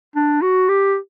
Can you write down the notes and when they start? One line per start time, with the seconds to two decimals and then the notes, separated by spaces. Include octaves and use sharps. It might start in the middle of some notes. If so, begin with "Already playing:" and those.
0.16 D4
0.42 F#4
0.68 G4